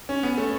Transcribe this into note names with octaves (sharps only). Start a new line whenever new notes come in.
C#4
B3
A3